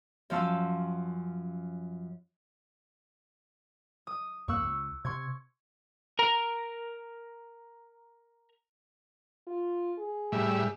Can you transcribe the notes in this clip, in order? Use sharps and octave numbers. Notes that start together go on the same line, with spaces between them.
F#2 F3 C#4 F5 A5 E6
D#6
F2 A#3 C#6 E6 F#6
C#2
C3 C6 C#6 G#6
A#4 A#5
F4
G#4
A2 G3 E5